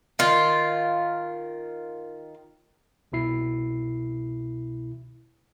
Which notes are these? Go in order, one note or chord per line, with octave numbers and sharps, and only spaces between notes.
D#3 F4
C2 B2 E4 C7